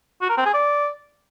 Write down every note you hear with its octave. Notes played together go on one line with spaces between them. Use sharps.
F#4
A#4
C4
G#4
D5